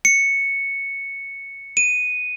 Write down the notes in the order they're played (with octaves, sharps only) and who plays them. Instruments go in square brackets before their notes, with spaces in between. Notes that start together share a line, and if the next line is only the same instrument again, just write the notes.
[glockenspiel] C#7
D#7